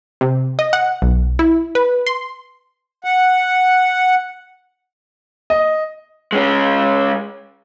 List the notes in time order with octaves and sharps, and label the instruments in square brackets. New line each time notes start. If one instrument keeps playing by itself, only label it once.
[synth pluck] C3
D#5
F#5
B1
E4
B4
C6
[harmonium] F#5
[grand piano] D#5
[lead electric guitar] G#3 C#4